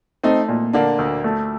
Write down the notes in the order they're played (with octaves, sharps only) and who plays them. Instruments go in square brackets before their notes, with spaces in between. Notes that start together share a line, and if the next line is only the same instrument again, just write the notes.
[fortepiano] A3 [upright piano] C4 D#4
[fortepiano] A#2
[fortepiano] D3 [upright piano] A#3 D4
[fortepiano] D2
A3